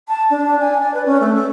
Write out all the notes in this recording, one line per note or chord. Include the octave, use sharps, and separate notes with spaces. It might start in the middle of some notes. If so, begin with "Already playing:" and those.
A5
D4
G#5
D5
B4
C#4
A3
A4